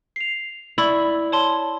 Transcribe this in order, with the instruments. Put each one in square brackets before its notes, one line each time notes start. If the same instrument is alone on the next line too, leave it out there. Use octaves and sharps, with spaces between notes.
[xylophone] C7 F7
[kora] E4 [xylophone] D5 B5 C#6
[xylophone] C#5 A5 C6